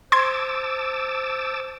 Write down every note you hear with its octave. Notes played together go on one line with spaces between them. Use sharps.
C5 A5 C6 D6 E6 G#6